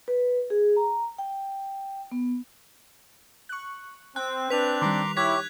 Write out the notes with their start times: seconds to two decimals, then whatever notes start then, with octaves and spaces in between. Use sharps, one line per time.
0.08 B4
0.50 G#4
0.76 A#5
1.18 G5
2.12 B3
3.49 C#6 F#6
4.16 C4 G5 F#6
4.50 C4 D4 B4 B6 F7
4.82 D#3 G3 A#5 C6 D6
5.17 E4 G4 C#5 F#6 G#6 B6